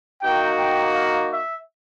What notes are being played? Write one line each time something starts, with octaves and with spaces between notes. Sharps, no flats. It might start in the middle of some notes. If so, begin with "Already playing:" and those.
A#3 D#4 F#4 G5
G5
F5
E5